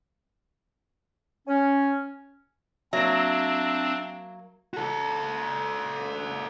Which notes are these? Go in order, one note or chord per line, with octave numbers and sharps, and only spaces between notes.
C#4
F#3 A#3 C4 D4 E5
F#4 A4